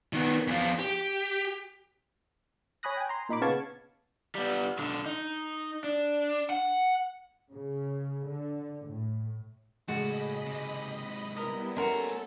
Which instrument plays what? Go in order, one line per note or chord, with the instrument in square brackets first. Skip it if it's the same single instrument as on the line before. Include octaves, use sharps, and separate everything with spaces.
[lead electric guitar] D#3 B3
E2 F3
G4
[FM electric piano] C#5 G#5 B5 D#6 F#6 A#6
G5 G#5
A#5 C6
A#2 D#4 B5 D6
C#3 B3 F5 A5 C#6 G#6
[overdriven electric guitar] G3 B3
B1 D3
D#4
D4
F#5
[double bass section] C#3
D3
A2
[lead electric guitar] A2 [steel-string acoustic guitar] C#3 G#3 [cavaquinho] F#4 D5 [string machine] D#5 B5
[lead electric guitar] G#2 C3
[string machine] G3 B3 E4 [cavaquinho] A#4 D#5
[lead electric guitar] A#3 E5 [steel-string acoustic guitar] C#4 [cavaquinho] F#4 A#4 C6 [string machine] A4